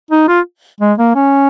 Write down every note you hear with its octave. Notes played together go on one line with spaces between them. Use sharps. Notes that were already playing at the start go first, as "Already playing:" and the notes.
D#4
F4
G#3
A#3
C#4